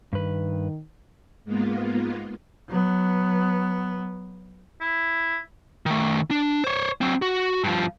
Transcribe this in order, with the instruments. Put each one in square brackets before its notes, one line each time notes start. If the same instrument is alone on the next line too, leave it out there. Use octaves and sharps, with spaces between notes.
[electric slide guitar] G2 B4 [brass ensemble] D#3
[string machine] G#2 G#3 A#3 B3 F4
[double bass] F#3 B3
[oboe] E4
[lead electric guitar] D#3 A3
D4
C5 C#5
F#3 C4
F#4
G2 F3